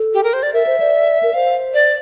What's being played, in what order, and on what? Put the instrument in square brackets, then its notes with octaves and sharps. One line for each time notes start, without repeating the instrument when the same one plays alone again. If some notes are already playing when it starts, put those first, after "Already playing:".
Already playing: [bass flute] A4
[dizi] G4
A#4
C5
D5
[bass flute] A#4 [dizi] E5
[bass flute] C5
D5
A#4
[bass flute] C5 [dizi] F5
[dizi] D5